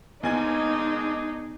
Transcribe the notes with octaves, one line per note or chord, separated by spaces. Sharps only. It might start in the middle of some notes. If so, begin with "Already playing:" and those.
D#2 G#3 B3 D4 D#4 G#4 G#5 G#6